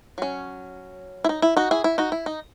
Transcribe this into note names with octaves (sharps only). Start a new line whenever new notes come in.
F#3 C#4
E4
D#4
E4
D#4 F#4
E4 G#4
E4
D#4 F#4
E4
D#4